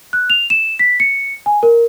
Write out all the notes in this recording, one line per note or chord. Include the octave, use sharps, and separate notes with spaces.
F#6
F7
E7
B6
C#7
G#5
A#4